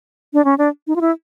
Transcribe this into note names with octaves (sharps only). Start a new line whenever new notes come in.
D4
C#4
D4
D#4
F4
E4